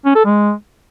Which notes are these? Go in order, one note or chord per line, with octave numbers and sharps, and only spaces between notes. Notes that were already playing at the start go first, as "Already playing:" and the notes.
C#4
A4
G#3